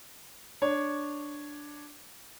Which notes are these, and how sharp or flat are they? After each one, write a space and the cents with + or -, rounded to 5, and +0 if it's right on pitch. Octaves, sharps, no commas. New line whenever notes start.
D4 +0 C#5 +0